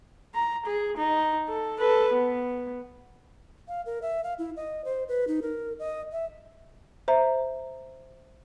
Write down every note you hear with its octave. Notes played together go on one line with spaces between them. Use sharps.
A#5
G#4
D#4
A4
A4 B4
B3
F5
A#4
E5
F5
E4
D#5
C5
B4
D#4
A#4
D#5
E5
C5 E5 A#5